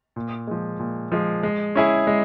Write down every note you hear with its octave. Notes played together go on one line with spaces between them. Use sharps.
A#2
F3 G#3
A#2
F3 G#3
G#3
C#4 E4 G#4
G#3